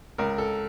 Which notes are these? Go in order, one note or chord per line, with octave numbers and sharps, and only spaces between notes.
C#2 A#4
A4